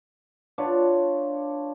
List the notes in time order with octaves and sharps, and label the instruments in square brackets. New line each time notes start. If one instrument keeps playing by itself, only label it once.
[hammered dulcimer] D4 F4 B4 C#5